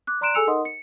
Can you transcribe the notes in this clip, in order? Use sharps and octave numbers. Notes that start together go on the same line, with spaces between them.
D6 F#6
D5 A#5 C6 F#6 D7 E7
G#4 A4 G#5 E6 C#7 F7
D#4 A#4 D#5 F#5 C6 D#6
C#7